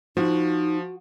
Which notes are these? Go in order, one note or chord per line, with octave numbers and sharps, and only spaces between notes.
F3 D#4 F#4